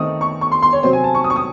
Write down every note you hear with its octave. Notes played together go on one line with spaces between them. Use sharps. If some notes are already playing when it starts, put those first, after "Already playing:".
Already playing: D#3 A3 C4 D#4 D#6
C#6
C#6
C6
C6
C#5
C3 F#3 C4 C5
G#5
A5
C#6
D#6
C#6
D#6